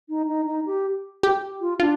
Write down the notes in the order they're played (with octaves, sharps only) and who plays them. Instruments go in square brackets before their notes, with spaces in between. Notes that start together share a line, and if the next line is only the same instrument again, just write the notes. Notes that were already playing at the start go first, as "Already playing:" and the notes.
[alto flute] D#4
D#4
D#4
G4
[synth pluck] G4
[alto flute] F4
[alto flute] D4 [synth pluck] F4